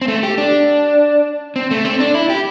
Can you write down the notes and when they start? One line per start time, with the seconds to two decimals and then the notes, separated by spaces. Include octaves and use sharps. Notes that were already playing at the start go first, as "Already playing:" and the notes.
0.02 C4
0.08 A3
0.23 G4
0.38 D4
1.56 C4
1.71 A3
1.85 C4
2.00 D4
2.15 E4
2.30 G4